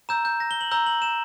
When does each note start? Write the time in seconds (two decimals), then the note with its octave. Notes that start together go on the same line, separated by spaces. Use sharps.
0.09 A#5 E6 G6 E7
0.25 G6
0.40 A#6
0.51 G7
0.61 F#7
0.71 A#5 E6 G6 G7
0.86 F#7
1.02 E7